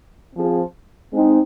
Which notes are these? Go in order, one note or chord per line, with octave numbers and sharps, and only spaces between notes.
F3 C4 F4 G#4
G#3 C4 D#4